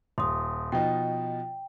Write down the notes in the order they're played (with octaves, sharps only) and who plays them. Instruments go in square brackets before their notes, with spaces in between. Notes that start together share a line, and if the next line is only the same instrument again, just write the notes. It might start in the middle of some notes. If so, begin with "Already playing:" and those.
[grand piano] D#1 [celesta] C6 D#6
[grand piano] B2 F3 D#4 [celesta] G5